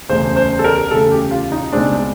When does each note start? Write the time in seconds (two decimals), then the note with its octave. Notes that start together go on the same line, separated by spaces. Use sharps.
0.09 E1 D2 C#3 C5
0.36 C5
0.59 A4
0.64 A#4
0.90 E1 D2 C#3 A4
1.12 G4
1.31 F4
1.52 D#4
1.72 C#2 B2 G#3 C4 D4